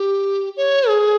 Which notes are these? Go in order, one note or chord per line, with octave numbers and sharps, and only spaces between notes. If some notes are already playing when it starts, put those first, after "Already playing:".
Already playing: G4
C#5
G#4